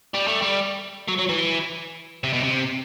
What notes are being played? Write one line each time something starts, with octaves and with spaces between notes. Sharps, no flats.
G3
A3
G3
F#3
F#3
E3
C3
B2
C3